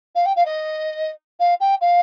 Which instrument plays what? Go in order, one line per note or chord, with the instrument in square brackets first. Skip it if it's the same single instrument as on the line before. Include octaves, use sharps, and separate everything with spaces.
[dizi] F5
G5
F5
D#5
F5
G5
F5